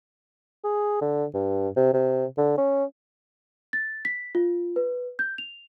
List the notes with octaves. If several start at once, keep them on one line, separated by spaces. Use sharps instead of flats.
G#4
D3
G2
C3
C3
D3
C#4
A6
B6
F4
B4
G6
F7